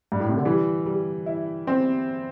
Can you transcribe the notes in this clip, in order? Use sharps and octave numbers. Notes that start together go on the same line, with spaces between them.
G2
A2
C3
D3
E3 G3
G3
E4
C4